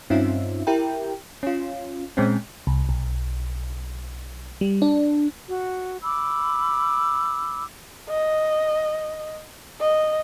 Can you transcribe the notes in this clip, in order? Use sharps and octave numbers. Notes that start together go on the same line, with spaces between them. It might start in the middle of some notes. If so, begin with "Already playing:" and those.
G2 C4 C#4 D#4 F4 E5
E4 G4 A#4 G5
C#4 F4
A#2 G#3 C4 C#4
C2
B1
G3
D4
F#4
B5 D6 E6
D#5
D#5